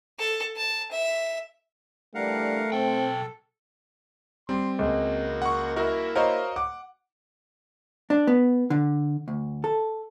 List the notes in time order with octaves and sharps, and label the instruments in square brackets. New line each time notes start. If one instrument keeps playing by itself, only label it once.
[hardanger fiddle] A4
A5
E5
[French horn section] E3 G3 D4 [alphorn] A3 [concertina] A#4 F5 F#5
[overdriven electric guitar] B1 G5 [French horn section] C4 [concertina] A4
[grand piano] G3 [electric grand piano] C4 [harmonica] C6
[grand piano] C#2 [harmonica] A#3 F#4
[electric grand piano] F#5 C#6
[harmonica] A#3 E4 E5 [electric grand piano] F#4 A#4
[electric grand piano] F#4 D#5 F5 [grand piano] A#4 C5 C#5
[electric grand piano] F#5 [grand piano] D6
[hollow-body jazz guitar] D4
B3
D3
D2
A4